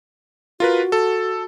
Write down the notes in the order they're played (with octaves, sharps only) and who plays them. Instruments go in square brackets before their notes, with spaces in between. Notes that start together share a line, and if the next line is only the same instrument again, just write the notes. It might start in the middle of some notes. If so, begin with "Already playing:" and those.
[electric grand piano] F4 A#4 B4 [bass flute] F#4
[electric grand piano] A4